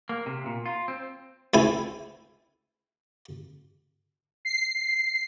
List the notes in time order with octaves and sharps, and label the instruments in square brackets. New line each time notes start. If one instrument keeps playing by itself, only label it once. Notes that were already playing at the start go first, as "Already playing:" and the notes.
[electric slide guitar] A#3
C3
A#2
F4
C4
[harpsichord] C#2 C4 E4 G#5
[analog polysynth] C7